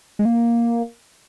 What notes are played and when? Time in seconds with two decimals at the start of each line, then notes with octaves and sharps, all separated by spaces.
0.19 G#3
0.25 A#3